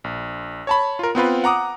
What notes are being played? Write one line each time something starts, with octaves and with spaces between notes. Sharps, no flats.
A#1
C#5 A5 B5
F4 A#4
B3 C4 F4 B4
F#5 A#5 D6 D#6